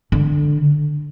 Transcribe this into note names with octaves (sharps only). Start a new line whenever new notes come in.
D3